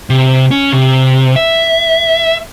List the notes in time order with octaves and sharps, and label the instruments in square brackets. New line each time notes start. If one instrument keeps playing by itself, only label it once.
[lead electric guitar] C3
C#4
C3
E5